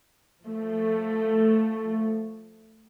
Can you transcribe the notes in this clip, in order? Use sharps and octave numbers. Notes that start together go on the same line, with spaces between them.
F3 A3